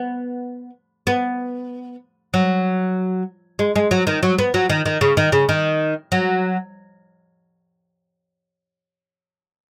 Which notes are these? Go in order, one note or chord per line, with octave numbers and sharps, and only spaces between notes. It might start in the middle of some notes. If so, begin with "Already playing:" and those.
Already playing: B3
B3
F#3
G#3
G#3
F#3
D#3
F#3
B3
F#3
D#3
D#3
C#3
D#3
C#3
D#3
F#3